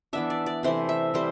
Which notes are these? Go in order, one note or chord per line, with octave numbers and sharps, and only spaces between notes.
E3 B3 D4 E5
D5
D5
C3 E3 A3 C5
E5
E3 G3 C4 C5